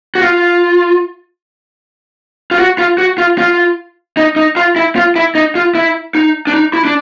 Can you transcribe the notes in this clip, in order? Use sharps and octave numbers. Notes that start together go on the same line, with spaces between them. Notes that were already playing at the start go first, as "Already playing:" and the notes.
F#4
F4
F4
F#4
F4
F#4
F4
F4
D#4
D#4
F4
E4
F4
E4
D#4
F4
E4
D#4
D4
D#4
E4
D4